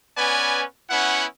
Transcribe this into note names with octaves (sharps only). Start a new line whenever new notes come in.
B3 C#4 B4 D5 G#5
B3 C#4 E4 F#5